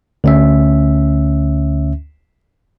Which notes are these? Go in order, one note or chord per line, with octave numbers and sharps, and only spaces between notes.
D2 C#4 E5